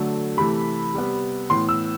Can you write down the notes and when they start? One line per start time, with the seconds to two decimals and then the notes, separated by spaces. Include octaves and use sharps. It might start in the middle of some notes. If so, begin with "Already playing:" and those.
Already playing: D3 F#3 A3
0.37 C3 E3 A3 B5
0.94 C3 G3 B3
1.50 A2 E3 B3 C6
1.69 E6